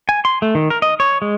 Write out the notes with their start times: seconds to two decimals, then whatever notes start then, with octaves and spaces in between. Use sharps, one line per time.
0.09 G#5
0.25 C6
0.42 A3
0.55 D#3
0.70 A#4
0.82 D#5
1.00 C#5
1.22 G#3